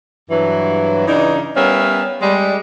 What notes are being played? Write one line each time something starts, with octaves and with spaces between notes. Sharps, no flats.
G2 E3 F#3
C#3 E3 D4 D#4
G3 B3 C#4 A#4 E5 F5
G3 G#3